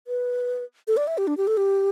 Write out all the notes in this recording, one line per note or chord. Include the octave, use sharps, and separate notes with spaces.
B4
A4
D5
E5
G4
D4
G4
A4
G4